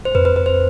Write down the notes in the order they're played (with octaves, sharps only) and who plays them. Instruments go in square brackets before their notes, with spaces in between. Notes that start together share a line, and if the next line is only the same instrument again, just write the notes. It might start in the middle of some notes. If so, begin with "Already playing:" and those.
[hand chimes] C5
[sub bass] F2 [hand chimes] B4
[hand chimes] B4
B4
C5